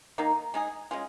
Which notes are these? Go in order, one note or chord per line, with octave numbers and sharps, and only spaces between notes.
D#3 A#3 D#4
G#3 D#4 G#4
G#3 C#4 F4 G#4